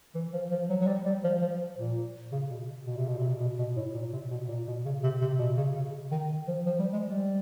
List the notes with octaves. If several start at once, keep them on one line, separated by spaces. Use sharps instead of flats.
E3
F3
F3
F#3
F#3
G3
G3
F3
F3
A#2
C#3
B2
B2
C3
B2
C3
B2
B2
B2
A2
A#2
C3
B2
A#2
B2
C#3
C3
C3
B2
C#3
C#3
D#3
F3
F3
G3
G#3
G3